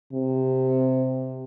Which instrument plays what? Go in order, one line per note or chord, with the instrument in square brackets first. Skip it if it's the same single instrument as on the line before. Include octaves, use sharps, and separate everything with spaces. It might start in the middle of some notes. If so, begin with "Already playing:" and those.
[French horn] C3